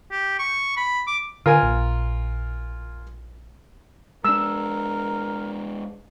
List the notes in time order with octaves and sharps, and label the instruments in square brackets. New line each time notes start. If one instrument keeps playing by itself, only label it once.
[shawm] G4
C#6
B5
D6
[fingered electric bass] D3 [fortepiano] F4 A#4 G#5
[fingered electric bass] A#1
[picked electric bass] G#3 D4 [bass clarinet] A#4 [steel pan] E6